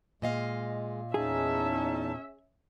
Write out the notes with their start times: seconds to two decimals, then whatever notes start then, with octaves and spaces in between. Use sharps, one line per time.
0.22 A#2 G#3 D#5 F5
1.14 E2 C#4 D#4 G#4 E5 A5